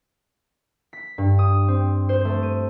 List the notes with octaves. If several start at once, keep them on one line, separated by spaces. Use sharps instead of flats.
B6
G2
D#6
C4
C5
A3
D#7